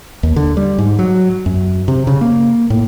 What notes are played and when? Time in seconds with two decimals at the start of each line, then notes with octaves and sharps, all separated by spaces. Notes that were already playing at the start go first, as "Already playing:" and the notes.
0.23 D#2
0.36 D3
0.57 G3
0.78 G#2
0.99 F#3
1.46 F#2
1.88 C3
2.07 C#3
2.21 A#3
2.70 A2